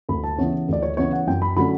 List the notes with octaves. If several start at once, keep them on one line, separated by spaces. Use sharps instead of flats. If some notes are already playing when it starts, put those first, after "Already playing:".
D2 B5
A5
C#3 E3 B3 C#5
D2 D5
C#5
C#3 E3 B3 C#5
F#5
F#2 G5
B5
D3 F#3 A3 C#4 B5